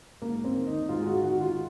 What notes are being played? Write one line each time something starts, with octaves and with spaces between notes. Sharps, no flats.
G#2 A#3
C4
D#3
D#4
G#2 F4
G#4
F#4
D#3 F#4
F4